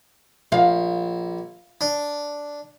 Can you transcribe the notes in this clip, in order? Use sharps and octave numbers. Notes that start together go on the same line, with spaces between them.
A#1 F5
D4